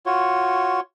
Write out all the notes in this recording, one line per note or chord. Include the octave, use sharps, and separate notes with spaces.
F4 F#4 C#5